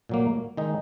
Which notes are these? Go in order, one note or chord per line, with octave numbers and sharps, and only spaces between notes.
A#2 F#3 A#3
D#3 G#3 D#4